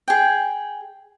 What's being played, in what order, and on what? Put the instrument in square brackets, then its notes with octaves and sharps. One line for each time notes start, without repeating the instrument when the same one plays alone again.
[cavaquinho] G#4 G5